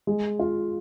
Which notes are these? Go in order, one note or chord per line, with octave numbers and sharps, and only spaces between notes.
G#3
F4